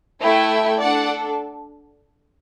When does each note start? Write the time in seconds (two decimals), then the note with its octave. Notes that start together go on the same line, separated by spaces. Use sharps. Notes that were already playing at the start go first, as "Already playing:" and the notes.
0.22 A3 E4 A4 E5 G5
0.81 D4 A4 D5 F#5